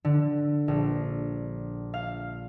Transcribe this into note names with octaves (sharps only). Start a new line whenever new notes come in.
D3
A#1
F5